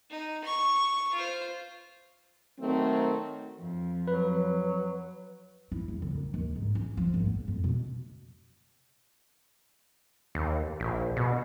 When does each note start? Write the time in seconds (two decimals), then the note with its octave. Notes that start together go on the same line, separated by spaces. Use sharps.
0.10 D#4
0.44 C#6
1.13 F4 C5
2.59 D#3 F#3 A3 C4
3.60 F2
4.08 F#3 B4
5.72 E4
5.88 E2
6.02 D3
6.15 D#3
6.34 D#2
6.56 G#2
6.75 C#4
6.97 F3
7.14 G#1
7.26 B3
7.48 F2
7.64 B2
10.35 D#2
10.80 A#1
11.16 B2